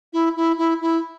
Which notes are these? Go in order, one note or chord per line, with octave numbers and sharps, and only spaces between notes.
E4
E4
E4
E4